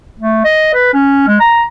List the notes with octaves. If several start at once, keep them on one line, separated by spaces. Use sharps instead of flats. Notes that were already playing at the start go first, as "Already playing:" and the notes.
A3
D#5
B4
C#4
G#3
A#5